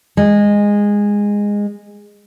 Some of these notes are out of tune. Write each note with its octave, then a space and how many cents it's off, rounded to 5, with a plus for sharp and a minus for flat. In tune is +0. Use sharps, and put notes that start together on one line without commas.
G#3 -15